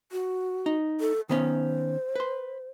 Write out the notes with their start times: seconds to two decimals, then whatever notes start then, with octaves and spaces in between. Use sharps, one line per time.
0.12 F#4
0.66 D#4
1.00 A4
1.29 D#3 B3 C#4 C5
2.16 B4 C6